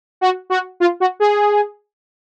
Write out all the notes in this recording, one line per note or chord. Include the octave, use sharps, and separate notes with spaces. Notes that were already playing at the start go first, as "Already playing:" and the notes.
F#4
F#4
F4
F#4
G#4